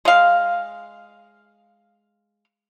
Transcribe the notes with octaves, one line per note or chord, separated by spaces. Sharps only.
G#3 F5